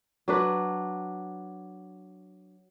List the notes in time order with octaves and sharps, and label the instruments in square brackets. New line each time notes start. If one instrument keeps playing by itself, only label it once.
[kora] F#3 D4 B4